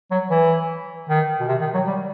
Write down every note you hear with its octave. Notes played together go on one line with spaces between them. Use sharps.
F#3
E3
D#3
B2
C3
D#3
F#3
G3